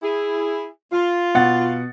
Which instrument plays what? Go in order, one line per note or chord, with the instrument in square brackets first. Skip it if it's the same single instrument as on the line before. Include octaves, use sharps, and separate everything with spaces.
[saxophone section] E4 G#4
F4
[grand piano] B2 F#5 A6